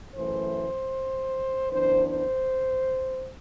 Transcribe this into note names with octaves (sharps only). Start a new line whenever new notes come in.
F#2 E3 A3 C5
F#2 E3 B3 D4 C5
C5